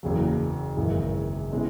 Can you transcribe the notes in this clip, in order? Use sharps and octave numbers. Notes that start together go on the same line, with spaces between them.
F#1 E2 C#3 F#3
G#1 F#2 C#3 E3
B2 G#3 C#4 E4